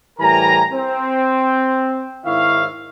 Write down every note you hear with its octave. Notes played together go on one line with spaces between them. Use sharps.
A2 E3 G3 A#4 G#5 A#5
C4
G#2 D#3 E4 C#5 E5 F5